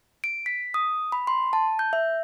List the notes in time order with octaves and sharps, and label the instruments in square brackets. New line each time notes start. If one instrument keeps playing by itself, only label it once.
[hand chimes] D7
B6
D#6
B5
C6
A5
G6
E5